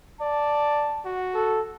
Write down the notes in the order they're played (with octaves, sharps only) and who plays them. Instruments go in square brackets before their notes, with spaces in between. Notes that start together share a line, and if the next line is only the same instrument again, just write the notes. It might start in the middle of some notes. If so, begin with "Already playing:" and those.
[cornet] D5 [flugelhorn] A5
[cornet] F#4
[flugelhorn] A4